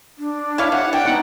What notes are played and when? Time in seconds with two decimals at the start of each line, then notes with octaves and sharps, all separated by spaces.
0.18 D4
0.58 E4 C#5 E5 F5
0.72 C3 F#5
0.93 D4 G5
1.06 B3 D#4 F#5